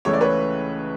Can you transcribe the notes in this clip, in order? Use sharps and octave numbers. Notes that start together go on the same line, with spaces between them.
C#2 C#3 E3 A3 C#5
D5
B4 C#5